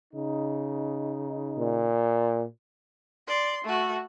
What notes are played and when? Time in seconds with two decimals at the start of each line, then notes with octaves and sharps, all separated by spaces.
0.14 C#3 D#4
1.58 A#2
3.28 D5 C6
3.64 A3 F#4